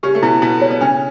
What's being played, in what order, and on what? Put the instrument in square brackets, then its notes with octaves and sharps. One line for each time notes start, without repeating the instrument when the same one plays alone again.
[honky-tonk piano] C#3 C#4 [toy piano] G4
[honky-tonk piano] A3
[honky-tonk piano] B2 B3 [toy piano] E4
[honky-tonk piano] B2 B3 [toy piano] E4
[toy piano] C#5
[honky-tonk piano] B3
[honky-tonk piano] C#3 C#4 [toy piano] D4